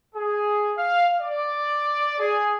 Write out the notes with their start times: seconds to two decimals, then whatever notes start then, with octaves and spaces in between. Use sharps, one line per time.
0.15 G#4
0.77 F5
1.21 D5
2.19 G#4